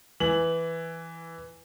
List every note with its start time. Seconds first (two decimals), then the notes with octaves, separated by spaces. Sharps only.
0.20 E3 F#7